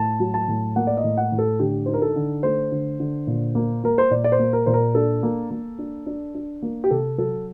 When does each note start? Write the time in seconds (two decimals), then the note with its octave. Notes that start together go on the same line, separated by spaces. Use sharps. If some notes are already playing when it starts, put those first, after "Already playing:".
Already playing: A2 A5
0.20 F#3
0.34 A5
0.48 A2
0.76 A#3 F#5
0.87 D5
0.97 D#5
1.04 A2
1.17 F#5
1.32 A2
1.38 A4
1.59 D3 G4
1.86 D#4 C5
1.94 A#4
2.02 A4
2.16 D3
2.43 A3 C5
2.72 D3
3.00 D3
3.27 A#2
3.55 A#3
3.84 A#3 A#4
3.98 C5
4.11 A#2 D5
4.24 D5
4.32 C5
4.39 A#3
4.53 A#4
4.66 A#2 C5
4.74 A#4
4.95 D4 A4
5.23 A#3
5.51 A#3
5.79 D4
6.06 D4
6.35 D4
6.62 A#3
6.84 G4
6.91 C3 A4
7.18 F#3 A4